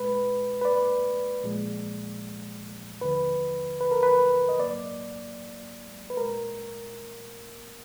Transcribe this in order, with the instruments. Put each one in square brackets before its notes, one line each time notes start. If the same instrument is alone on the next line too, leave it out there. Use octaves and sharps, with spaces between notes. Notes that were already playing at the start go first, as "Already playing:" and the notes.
Already playing: [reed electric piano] A#2 G#3 B4
B4
D5
A#2 F3 G#3
D#2 D3 F3 B4
B4
A#4
B4
D#5
G#2 F#3 A#3 D5
B4
A#2 G#3 A#4